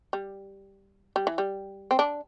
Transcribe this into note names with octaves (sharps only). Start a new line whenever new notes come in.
G3
G3
E3
G3
C4
D4